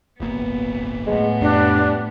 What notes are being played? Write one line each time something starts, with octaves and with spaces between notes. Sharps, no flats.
D1 G1 A#3 B3
A2 G#3 B3
F2 G3 D4